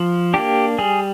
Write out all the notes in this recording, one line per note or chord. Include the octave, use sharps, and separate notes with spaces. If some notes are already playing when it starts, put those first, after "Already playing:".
Already playing: F3
A#3 D4 G4
G3 G#4